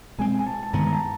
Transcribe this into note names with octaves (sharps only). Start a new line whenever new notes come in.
B2 G#3 C4 G#5
G#5
A5
A5
G2 D#3 G#3 B3 A#5
A#5
A5